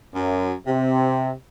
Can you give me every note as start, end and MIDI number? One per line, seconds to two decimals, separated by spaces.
0.15 0.54 42
0.67 1.33 48